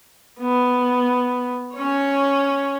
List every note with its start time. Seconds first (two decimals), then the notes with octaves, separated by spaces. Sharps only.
0.40 B3
1.74 C#4 C#5